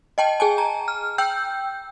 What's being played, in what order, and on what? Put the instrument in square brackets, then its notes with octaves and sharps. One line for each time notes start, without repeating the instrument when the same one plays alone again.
[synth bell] D#5 G5 A5
G#4 G#5 A5
A#5
F6
G5 E6 G6